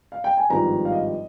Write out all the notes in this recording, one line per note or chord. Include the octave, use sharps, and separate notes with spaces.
F5
G5
G#5
G#1 G2 F3 A#5
F5
D#5